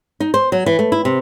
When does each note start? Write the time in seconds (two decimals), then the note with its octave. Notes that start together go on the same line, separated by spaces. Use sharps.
0.20 D#4
0.34 C5
0.52 F#3
0.66 E3
0.79 A3
0.92 E4
1.05 C3